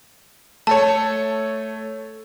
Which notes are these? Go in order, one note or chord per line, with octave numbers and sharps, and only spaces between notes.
A3 A4 C#5 A5